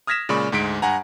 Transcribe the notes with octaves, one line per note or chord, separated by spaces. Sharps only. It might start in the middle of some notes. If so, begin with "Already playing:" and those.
D#6 F6 G#6 A#6 B6 E7
A#2 C#3 G#3 D5 B5 C#6
D2 G#2 G#3 B6 D7
G2 F#5 G#5 A#5